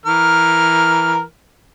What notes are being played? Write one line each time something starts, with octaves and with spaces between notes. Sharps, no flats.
E3 A#4 F6